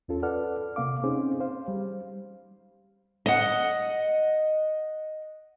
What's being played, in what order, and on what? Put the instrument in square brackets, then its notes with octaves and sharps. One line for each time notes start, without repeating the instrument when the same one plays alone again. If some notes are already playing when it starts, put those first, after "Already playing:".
[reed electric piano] E2 C#4 F4 A4
A4 B4 D5 F#5 F6
C3 A#3 F5 D6
C4 C#4 D#4 G#4 C5
C5 F5
G3
[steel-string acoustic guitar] D#5 F#5